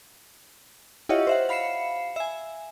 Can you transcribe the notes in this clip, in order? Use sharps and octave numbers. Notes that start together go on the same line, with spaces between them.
E4 F4 G4 C#5 D#5 F#5
C5 E5 F#5
F5 B5 C7 C#7 E7
E5 G#5